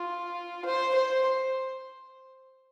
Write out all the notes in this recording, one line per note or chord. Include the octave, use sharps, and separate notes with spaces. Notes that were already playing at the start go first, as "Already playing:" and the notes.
Already playing: F4
C5
C5